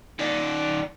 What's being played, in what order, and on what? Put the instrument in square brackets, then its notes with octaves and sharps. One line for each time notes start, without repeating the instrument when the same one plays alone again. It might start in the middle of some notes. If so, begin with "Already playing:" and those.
[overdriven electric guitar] D#3 D5